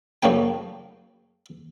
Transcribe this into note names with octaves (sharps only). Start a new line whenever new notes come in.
F#2 C#3 A3 A#3 G5